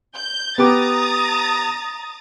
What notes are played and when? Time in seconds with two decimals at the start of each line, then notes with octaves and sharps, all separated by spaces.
0.16 G6
0.58 B3 G4 A#5 D6 D#6 A6